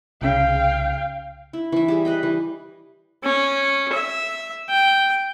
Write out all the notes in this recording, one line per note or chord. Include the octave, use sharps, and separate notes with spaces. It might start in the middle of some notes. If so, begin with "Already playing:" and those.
C2 C#3 F5 G5
E4
E3 E5
G3 G#4
B4 D#5 G5
E3
C#4
E5
G5